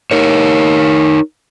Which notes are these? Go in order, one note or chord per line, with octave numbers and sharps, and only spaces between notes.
D#4 A#4 C#5